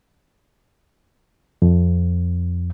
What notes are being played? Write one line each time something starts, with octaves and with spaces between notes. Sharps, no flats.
F2